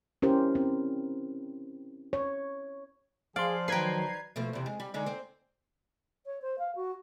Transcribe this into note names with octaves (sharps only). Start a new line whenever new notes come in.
C#4 E4 G4 A#4 C5
C4
C#5
F3 G#4 D5 F5 C6
D#3 F#3 B4 G5 A#5 G#6 C7
B2 F3 A3
E2 C3
G#3
G3
D3 G#3 D#4
C4
C#5
C5
F5
F#4